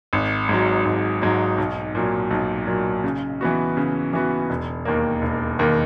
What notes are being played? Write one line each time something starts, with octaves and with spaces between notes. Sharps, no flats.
G#1
G#2 F#3
G#1
G#2 F#3
B1
A#2 F#3
B1
A#2 F#3
C#3
E3 B3 F#4
C#3
E3 B3 F#4
E1
D#2 D#3 A#3
E1
D#2 D#3 A#3